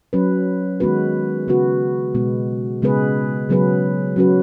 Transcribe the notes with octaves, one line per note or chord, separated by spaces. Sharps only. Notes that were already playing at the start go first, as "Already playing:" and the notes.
F#3 C#4 B4
D#3 G#3 B3 F#4 B4
C#3 B3 F#4 B4
B2 G#3 B3
C#3 G#3 B3 G#4 B4
C#3 F#3 B3 G#4 B4
F#3 C#4 F#4 B4